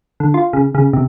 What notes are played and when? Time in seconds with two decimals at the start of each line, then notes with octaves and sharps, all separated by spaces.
0.20 D3
0.34 F4
0.53 C#3
0.75 C#3
0.93 C3